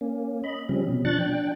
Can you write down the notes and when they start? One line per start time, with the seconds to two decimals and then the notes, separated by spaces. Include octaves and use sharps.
0.01 A#3 C#4
0.44 D#5 B5
0.69 C#3 F3 G3 C4 C#4
0.89 B2
1.05 F3 D4 C#6 F#6 A6
1.19 D4 G5